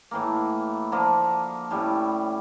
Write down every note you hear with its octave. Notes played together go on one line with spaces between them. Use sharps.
A2 E3 A#3
D3 F3 A#3
A2 G3 C#4